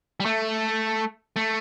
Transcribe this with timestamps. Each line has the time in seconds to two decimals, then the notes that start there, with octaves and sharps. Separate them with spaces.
0.20 G3
0.25 A3
1.36 A3